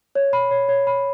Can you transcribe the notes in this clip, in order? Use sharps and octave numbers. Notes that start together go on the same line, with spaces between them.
C#5
B5
C#5
C#5
B5